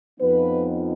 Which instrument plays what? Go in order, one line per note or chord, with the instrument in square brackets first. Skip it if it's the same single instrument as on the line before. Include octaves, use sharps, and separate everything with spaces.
[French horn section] F2 F3 B3 D#4 B4